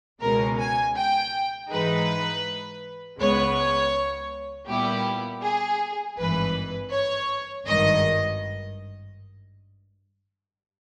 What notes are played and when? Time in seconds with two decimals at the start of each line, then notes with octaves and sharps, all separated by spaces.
0.21 C#2 B2 G#3 C#4 A#4
0.59 G#5
0.96 G5
1.70 G#2 E3 G#3 D#4 B4
3.19 C#2 C#3 G#3 B3 C#5
4.68 A#2 G3 B3 E4 G4
5.42 G#4
6.17 G#1 G2 E3 B4
6.92 C#5
7.67 G#1 G2 D#3 D#5